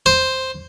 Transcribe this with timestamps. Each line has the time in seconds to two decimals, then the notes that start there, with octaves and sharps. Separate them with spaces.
0.06 C5